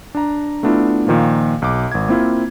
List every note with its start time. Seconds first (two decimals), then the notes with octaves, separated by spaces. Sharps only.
0.15 D4 A#5
0.63 A3 B3 D4 E4 F4
1.07 A#2 D#3 F3 A#3
1.62 B1 D6
1.92 G#1 G#6
2.08 A#3 C4 E4 F4